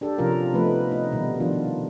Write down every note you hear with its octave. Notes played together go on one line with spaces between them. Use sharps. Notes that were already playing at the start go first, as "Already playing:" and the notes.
D4 G4 A4
C3 F3 C#4 F4 A#4
F3 A3 B3 D#4 B4
D#4
B2 D#3 G3 B3
F3 D4 F4